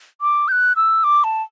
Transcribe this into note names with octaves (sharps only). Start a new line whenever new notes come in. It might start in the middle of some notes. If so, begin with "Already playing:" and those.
D6
G6
F#6
E6
D6
A5